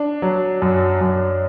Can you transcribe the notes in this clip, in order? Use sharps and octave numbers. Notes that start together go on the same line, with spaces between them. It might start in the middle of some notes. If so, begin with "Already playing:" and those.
Already playing: D4
F#3
F#2
F#2